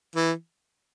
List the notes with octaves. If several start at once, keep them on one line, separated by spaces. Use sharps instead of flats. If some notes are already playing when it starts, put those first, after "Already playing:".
E3